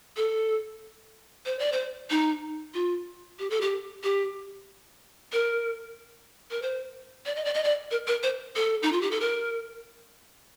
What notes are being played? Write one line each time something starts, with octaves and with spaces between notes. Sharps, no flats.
A4
C5
D5
C5
D#4
F4
G4
A4
G4
G4
A#4
A#4
C5
D5
D#5
D5
D#5
D5
A#4
A#4
C5
A4
D#4
F4
G4
A4
A#4